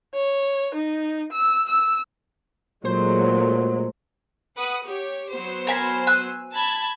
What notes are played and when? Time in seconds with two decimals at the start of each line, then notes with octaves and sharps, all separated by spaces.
0.14 C#5
0.74 D#4
1.32 E6
1.69 E6
2.85 A#2 F#3 G#3 A3 C5
4.56 B4 F#5 D#6
4.85 G4 C#5
5.32 F#3 B3 C5
5.67 A#4 G#5 B5
6.07 G#5 E6 F#6
6.54 A5 B5 G#6